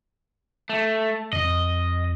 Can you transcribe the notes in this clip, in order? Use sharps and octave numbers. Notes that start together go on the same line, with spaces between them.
A3
F2 D#5